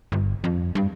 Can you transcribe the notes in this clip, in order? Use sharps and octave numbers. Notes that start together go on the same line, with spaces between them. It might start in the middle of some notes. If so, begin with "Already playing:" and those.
G1
F2
G2